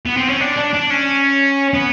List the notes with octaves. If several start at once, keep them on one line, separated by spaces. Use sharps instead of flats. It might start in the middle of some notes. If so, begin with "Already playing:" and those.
B3
C4
C#4
D4
D4
D4
C#4
B3